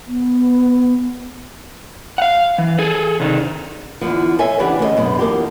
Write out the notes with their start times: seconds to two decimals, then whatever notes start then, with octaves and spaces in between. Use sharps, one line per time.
0.07 B3
2.18 F5 F#5
2.58 E3
2.78 G#4 A4
3.20 C3 D#3
4.01 E2 G#2 D3 F3
4.39 A4 C5 C#5 E5 G#5
4.59 C#3 E3 D4 F#4 G4
4.79 D2 C#3 A#4 D#5
4.97 F#2 B2 D3
5.19 E2 F3 A#3 D4 G4